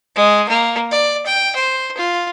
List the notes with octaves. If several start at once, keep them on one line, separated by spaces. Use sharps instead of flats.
G#3
A#3
D5
G5
C5
F4